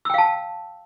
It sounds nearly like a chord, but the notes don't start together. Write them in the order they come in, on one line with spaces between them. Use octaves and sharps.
E6 G5 F5 A5